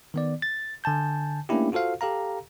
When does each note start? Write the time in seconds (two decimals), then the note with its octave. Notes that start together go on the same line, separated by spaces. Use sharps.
0.14 D#3 B3 D5
0.42 A6
0.84 D3 G#5 A5 G6
1.49 A3 A#3 C#4 D4 E4 G4
1.72 F4 F#4 A4 C5 F5
2.01 G4 A4 F5 A#5